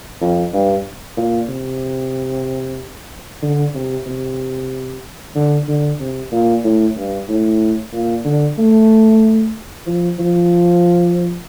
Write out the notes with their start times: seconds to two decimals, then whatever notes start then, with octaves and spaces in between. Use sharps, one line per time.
0.21 F2
0.53 G2
1.17 A#2
1.49 C3
3.43 D3
3.75 C3
4.07 C3
5.35 D3
5.68 D3
6.00 C3
6.32 A#2
6.64 A2
6.97 G2
7.28 A2
7.92 A#2
8.25 D3
8.58 A3
9.87 F3
10.19 F3